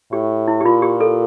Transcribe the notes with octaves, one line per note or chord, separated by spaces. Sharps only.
A2 G4
E4
G4
A#2 F4
G4
A4